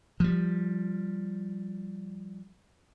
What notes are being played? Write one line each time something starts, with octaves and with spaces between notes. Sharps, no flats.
F3 G3